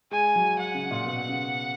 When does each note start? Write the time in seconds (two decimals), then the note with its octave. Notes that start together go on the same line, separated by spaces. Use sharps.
0.11 G#3 G#5
0.36 F#3
0.59 F#5
0.74 C#3
0.91 A#2
1.06 B2
1.29 C#3